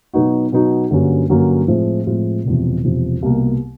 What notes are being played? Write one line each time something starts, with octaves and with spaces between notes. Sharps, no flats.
B2 F#3 B3 D#4 F#4
B2 F#3 B3 D#4 F#4
G2 D3 F#3 A#3 C#4
G2 D3 F#3 A#3 C#4
A2 F3 G#3 C4 F4
A2 F3 G#3 C4 F4
E1 E2 C3 F3
E1 E2 C3 F3
C2 B2 G3 A#3